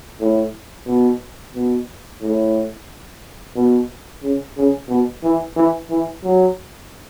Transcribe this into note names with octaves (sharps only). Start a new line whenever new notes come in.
A2
B2
B2
A2
B2
C#3
C#3
B2
E3
E3
E3
F#3